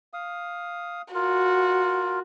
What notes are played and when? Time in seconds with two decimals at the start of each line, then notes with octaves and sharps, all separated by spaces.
0.13 F5 D#6
1.14 F4 F#4 A#4